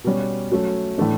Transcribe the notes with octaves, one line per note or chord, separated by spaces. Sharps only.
B2 G3 C#4 F#4
F#3 A3 C#4
A2 E3 A3 D4